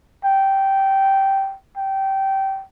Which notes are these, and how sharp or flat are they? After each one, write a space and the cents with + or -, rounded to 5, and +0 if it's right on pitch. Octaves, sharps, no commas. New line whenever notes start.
G5 -10
G5 -20